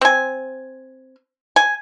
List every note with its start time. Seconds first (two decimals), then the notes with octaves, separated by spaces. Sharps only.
0.01 C4 G#5
1.56 G#5